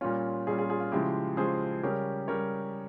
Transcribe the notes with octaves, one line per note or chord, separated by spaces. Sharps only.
A#2 G3 C#4 F4
A#2 G3 C#4 F4 G#4
F4 G#4
F4 G#4
F4
C#3 F3 G#3 E4 G4
C#3 F3 G#3 G#4 C5
C#3 G3 C#4 G4 A#4
C#3 G3 C#4 A#4 C#5